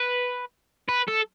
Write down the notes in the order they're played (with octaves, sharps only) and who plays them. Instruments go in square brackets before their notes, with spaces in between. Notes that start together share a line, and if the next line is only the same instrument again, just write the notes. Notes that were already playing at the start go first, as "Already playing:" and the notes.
Already playing: [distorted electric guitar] B4
B4
A4